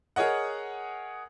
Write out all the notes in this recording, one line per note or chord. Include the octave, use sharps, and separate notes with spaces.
G#4 A#4 C#5 D#5 F#5